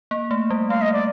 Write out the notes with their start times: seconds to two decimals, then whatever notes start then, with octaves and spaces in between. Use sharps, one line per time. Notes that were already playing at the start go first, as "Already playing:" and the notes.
0.11 A#3
0.31 A3
0.50 G3
0.69 A3 F5
0.82 D#5
0.93 D5